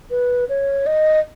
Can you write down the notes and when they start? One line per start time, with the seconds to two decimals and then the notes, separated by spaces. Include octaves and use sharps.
0.11 B4
0.49 C#5
0.86 D#5